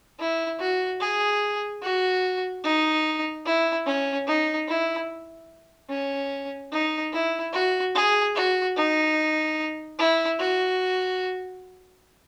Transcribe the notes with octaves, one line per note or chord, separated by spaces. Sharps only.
E4
F#4
G#4
F#4
D#4
E4
C#4
D#4
E4
C#4
D#4
E4
F#4
G#4
F#4
D#4
E4
F#4